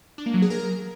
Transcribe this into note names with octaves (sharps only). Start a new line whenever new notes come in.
D4
A#3
F#3
G#4
A#4